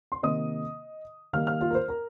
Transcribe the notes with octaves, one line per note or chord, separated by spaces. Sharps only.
C6
C3 D#3 A#3 D#5 D#6
D#3 G3 A#3 F5 F6
F5 F6
F4 F5
A#4
C5
A#4 A#5